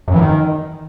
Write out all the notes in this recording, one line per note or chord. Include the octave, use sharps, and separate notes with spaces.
F#2
E3
D#3